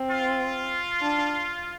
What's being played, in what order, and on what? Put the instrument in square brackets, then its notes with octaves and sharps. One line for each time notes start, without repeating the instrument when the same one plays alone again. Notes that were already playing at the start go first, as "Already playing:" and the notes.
Already playing: [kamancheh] C4
[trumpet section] F4
[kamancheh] D4